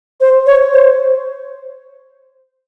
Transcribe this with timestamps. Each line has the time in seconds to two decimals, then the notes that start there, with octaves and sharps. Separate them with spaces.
0.21 C5
0.46 C#5
0.73 C5